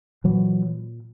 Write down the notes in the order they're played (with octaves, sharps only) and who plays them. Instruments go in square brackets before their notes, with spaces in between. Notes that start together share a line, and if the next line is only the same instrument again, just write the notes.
[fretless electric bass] A#2 E3 F#3